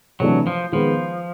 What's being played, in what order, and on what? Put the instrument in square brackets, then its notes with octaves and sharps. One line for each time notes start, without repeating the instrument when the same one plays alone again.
[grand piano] C3 E3 A3 D4 [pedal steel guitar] F#3
[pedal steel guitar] F3
[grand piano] D#3 G#3 B3 [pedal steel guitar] F3